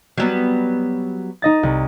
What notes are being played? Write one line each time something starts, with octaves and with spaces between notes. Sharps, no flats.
F#3 G3 B3
D#4 D#5 A6
C2